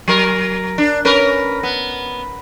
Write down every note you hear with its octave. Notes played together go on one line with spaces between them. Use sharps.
F#3 A#4
D4
C#4 A#4 B4
B3